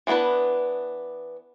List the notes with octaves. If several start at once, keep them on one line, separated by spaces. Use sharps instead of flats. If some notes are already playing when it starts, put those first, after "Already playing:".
E3 G#3 B3 D4 B4